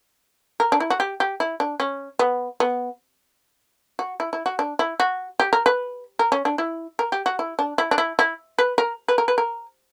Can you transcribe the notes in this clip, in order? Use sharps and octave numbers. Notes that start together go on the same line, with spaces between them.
A#4
D4
E4
F#4
G4
G4
E4
D4
C#4
B3
B3
F#4
E4
E4
F#4
D4
E4
F#4
G4
A#4
B4
A#4
C#4
D4
E4
A#4
G4
F#4
E4
D4
E4
D4
E4
E4
B4
A#4
B4
A#4
B4
A#4